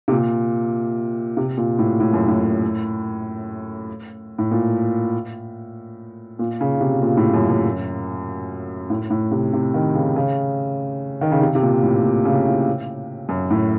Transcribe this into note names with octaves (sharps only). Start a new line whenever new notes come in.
C3
A#2
C3
A#2
A2
A2
F#2
A2
A2
A#2
A#2
C#3
C3
A#2
A2
F#2
F#2
A2
A2
C3
C3
D#3
C#3
C#3
D#3
C#3
C3
C3
A#2
A2
A#2
C#3
A2
F#2
A2